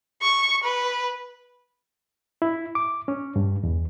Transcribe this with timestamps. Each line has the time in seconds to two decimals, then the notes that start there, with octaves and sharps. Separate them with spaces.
0.22 C#6
0.64 B4
2.42 E4
2.75 D6
3.08 C#4
3.36 G2
3.63 E2